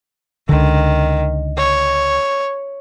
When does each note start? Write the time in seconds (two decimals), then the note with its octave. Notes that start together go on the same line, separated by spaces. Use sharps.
0.49 C#2 D3 D#3
1.58 C#5